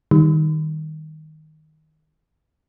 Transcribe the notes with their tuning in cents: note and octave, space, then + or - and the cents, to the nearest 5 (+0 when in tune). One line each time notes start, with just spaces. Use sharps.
D#3 +0 G3 +0